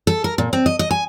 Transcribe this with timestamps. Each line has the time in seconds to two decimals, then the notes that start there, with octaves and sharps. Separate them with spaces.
0.07 A4
0.24 A#4
0.38 A#2
0.53 C4
0.66 D#5
0.79 D#5
0.91 G#5